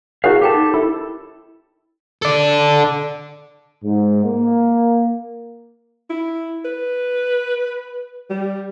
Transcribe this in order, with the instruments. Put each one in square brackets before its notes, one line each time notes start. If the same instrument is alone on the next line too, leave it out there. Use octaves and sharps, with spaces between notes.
[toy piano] E4 A#4 C#5 [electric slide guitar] F#4 F5 [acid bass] G#4
[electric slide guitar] G4 A5 [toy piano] A4 G5
[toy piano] D#4
[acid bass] E4 [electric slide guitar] A4
[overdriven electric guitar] A4 D5
[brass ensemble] G#2
A#3
[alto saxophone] E4
B4
G3